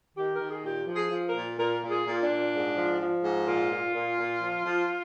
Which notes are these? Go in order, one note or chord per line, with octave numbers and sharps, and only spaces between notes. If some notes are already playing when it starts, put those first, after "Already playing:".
D#3 G4
D#3 A#4
G#4
A#2 G4
F3
G#4
F3
A#4
A#2
A#2 A#4
A#2
G#4
A#2
D4
A#2
G#2
F3
F3
G#2
A#2 F4
A#2
A#2
A#2
F3
F3